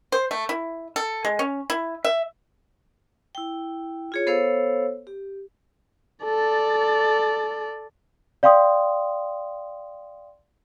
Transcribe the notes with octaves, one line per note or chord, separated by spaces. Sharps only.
C5
A3
E4
A4
G#3
C#4
E4
E5
E4 G5
F4 G#4 C#5
B3 A4 C5 C#5 F5 E6
G4
A4 D5
D5 F5 G5 C6 D#6